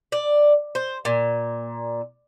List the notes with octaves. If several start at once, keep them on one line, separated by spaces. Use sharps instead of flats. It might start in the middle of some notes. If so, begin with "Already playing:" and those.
D5
C5
A#2